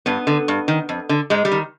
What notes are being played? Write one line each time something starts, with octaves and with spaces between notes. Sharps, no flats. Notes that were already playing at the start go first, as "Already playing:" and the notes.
G2 B3
D3
G2
D#3
F2
D3
G#2 G#3
G3
D#3